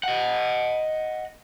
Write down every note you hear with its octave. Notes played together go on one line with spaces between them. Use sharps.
D#5 F#5